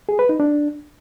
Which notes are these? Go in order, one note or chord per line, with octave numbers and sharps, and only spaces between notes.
G#4
B4
D#4
D4